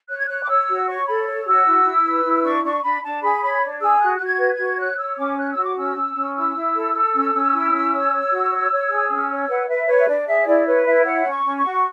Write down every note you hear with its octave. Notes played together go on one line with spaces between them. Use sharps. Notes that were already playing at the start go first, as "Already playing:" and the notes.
C#5 F#6
G#6
C#5 F#6
D6
C#5 E6
F#4
C#5 C#6
A4 B5
C#5
F#4 E6
E4
E4
B4
E4
D4 C#6
D4 C#6
D4 B5
D4 A5
G#4 B5
C#5 B5
D4
G#4 E6
F#4 F#6
F#4 F#6
G#6
B4
G#6
F#4
C#5 F#6
C#5 E6
C#4 D6
C#5 F#6
E6
F#4
D6
C#4 E6
C#4
C#4
E4 E6
E4
A4
A4
C#4
C#4
E4
C#4
C#5
C#5
F#4
C#5
C#5
G#4
C#4
C#5
B4 F#5
B4 E5
B4 C#5
E5
D4 D5
G#4 E5
C#5
E4 D5
B4 C#5
E4 E5
C#5 F#5
C#4
C#6
C#4
C#6
F#4